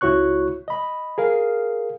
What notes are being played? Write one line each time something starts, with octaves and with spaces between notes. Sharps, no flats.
C#2 E4 F#4 C#5 C#6 F#6
D#5 B5
G#4 A#4 F5